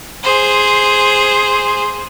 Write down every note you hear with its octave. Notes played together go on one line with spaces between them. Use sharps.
G#4 C5